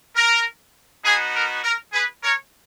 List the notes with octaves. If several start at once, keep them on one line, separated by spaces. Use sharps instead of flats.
A#4
B3 D#4 F#4 G#4
A#4
A#4
G#4 B4
A#4 C#5